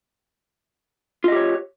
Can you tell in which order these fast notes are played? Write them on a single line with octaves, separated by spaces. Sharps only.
F4 D#5 G4 C#5